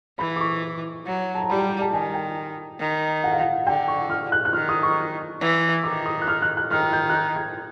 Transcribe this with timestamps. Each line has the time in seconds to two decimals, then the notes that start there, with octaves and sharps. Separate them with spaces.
0.19 E3 B5
0.36 D6
0.41 C#6
1.06 F#3
1.35 A5
1.41 A#5
1.49 G3 B5
1.60 A#5
1.71 A#5
1.81 A5
1.92 D#3 G#5
2.14 G5
2.79 D#3
3.24 F#5
3.32 F5
3.40 F#5
3.67 D3 G5
3.88 C#6
4.10 F6
4.32 F#6
4.45 F#6
4.53 D#3 F6
4.69 D#6
4.83 C#6
5.41 E3
5.83 D#3 D6
6.06 D#6
6.22 F#6
6.28 F6
6.42 F#6
6.57 F#6
6.71 D#3 F6
6.93 G6
7.09 F#6
7.14 G6
7.36 G#6